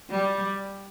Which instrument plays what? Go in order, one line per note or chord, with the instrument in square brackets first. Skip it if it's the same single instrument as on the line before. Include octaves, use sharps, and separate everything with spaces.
[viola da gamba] G3